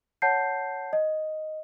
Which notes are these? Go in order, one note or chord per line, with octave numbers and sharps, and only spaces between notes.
C#5 F#5 A5 G6 C7
D#5